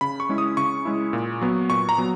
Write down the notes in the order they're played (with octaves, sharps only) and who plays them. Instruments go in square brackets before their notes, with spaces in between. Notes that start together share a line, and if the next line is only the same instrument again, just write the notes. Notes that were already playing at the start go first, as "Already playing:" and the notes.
[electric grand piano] C#3 B5
C#6
G#3 C#4 E4
D#6
C#3 C#6
G#3 C#4 E4
A#2
F#3 B3
A#2 C#6
A#5
F#3 B3